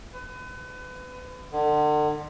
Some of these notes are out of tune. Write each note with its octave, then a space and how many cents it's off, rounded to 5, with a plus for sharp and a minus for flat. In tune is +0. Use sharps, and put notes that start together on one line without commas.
B4 +30
D3 +40